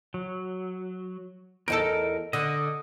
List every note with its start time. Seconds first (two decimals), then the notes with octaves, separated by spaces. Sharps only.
0.14 F#3
1.68 E2 D#4 A4 A#4
2.33 D3 D#5